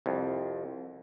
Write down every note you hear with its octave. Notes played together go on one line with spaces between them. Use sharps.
C2 F2